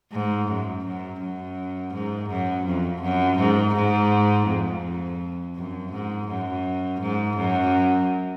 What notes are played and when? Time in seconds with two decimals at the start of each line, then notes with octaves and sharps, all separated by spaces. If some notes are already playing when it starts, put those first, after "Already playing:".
0.12 G#2
0.48 F#2
0.85 F#2
1.21 F#2
1.93 G#2
2.29 F#2
2.66 F2
3.02 F#2
3.39 G#2
3.75 G#2
4.47 F2
5.55 F#2
5.92 G#2
6.28 F#2
7.00 G#2
7.37 F#2